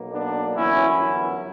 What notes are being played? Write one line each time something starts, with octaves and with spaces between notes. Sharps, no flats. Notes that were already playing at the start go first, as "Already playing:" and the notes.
Already playing: B1 B2 A#3
B3 D4
G1 F#2 E3 B3 C#4 E4